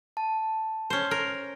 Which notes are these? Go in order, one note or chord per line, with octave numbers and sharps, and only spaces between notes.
A5
C#4 C5
A#4